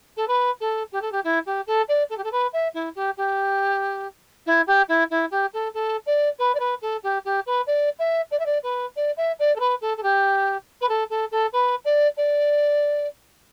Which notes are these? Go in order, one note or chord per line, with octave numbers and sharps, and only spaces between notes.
A4
B4
A4
G4
A4
G4
E4
G4
A4
D5
A4
G4
A4
B4
E5
E4
G4
G4
E4
G4
E4
E4
G4
A4
A4
D5
B4
D5
B4
A4
G4
G4
B4
D5
E5
D5
E5
D5
B4
D5
E5
D5
A4
B4
A4
A4
G4
B4
A4
A4
A4
B4
D5
D5